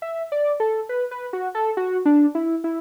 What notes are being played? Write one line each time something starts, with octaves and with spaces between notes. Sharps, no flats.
E5
D5
A4
B4
B4
F#4
A4
F#4
D4
E4
E4